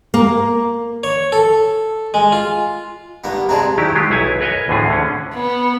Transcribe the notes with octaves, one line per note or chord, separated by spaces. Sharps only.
A#3
C#5
A4
G#3
F4
G2 A#3 B3
G3 G#3 C4 A5 A#5
D#3 F#3 D#4 E4 G4
F#3 G#3 F4 G4
B1 E4 B4 C#5 G#5
A#4 B4 C#5 D#5 G#5
D2 A2 D3 F4 G#4
D3 C#4
B3